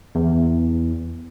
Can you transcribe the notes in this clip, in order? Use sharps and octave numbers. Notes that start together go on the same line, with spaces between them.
E2